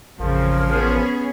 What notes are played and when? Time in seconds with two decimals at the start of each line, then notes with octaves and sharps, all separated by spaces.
0.19 A1 F2 C#3 F3 A#4
0.70 B3 C#4 G#4